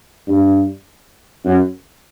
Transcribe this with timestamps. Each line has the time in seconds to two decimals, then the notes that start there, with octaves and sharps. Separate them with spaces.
0.28 G2
1.44 F#2